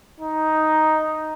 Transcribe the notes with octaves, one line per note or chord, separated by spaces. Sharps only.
D#4